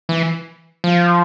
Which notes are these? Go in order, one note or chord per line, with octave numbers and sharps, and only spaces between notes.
E3
F3